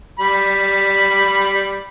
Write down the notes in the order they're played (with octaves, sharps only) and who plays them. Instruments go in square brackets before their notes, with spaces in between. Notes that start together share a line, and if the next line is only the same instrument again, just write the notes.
[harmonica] G3 B5